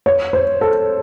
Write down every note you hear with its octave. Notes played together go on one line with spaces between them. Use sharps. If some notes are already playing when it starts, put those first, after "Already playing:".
C#5
C5
A4